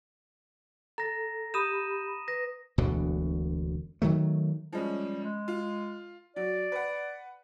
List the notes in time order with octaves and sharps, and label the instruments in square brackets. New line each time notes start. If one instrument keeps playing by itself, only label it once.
[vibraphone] A4 [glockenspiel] A#5 A#6
[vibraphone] G4 B5 [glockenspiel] D#6 D#7 E7
[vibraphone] B4 [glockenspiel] A#6
[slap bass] E1 D2 B2 D3
D#3 F#3 A3
[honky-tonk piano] F3 G#3 C#4 [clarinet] G3
[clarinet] G#3
[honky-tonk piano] F4
[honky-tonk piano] F#3 [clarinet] D5
[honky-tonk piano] B4 F#5